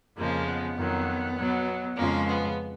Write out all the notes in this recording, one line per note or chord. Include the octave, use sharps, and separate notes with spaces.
F2 C#3 F3 G#3 A#3
B3
F2 D#3 F#3
B2 F#3
F2 C#3 F3 G#3 A#3 C#4
B3